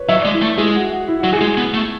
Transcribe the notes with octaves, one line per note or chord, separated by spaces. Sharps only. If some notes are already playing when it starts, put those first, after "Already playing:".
Already playing: B4 C#5
F#3 E5
G#3 D5
E4
A3
G#3 G#4
F#4
F#4
E4
F#3 F#4
G#4
G#3
B3
A3